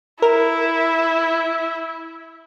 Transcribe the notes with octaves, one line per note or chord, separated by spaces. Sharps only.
E4 A#4